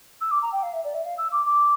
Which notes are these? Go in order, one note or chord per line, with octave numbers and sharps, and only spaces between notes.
E6
D6
A#5
G5
F5
E5
D5
E5
F5
E6
D6
D6